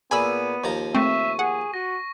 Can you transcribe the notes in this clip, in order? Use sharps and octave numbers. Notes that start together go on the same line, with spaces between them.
A#2 B3 G#4 G#5 B5 E6 D#7
D#2 F3 A#5
A3 C4 E5 C#6
G#4 F#5
F#4 A#6